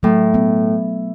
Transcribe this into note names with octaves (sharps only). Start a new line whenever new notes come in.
A2 F#3
B3